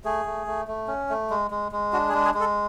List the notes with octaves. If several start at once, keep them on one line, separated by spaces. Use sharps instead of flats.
A3 G#4
A3
A3
A3
C#4
A3
G#3
G#3
G#3
D4 F#4
G#4
G#3
G#4
G#3
A4